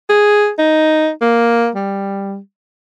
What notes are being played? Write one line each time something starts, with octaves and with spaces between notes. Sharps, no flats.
G#4
D#4
A#3
G3